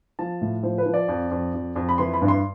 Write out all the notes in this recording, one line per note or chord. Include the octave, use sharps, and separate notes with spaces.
F3 A5
A2
F3 C5
B4
F3
D5
F2
F2
F2
F2
B5
E3 C6
B5
G2
C6